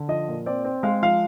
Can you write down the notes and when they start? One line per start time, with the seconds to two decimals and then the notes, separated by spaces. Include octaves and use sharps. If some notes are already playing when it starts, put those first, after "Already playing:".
Already playing: D3
0.08 F3 D#5
0.28 A#2
0.46 C4 D5
0.65 C4
0.83 G#3 F5
1.02 F3 F5